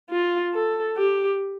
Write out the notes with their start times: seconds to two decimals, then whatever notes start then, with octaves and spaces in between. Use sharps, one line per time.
0.10 F4
0.54 A4
0.97 G4